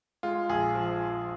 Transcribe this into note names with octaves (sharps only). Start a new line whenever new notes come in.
G#3 F4
A#1 G#4
F3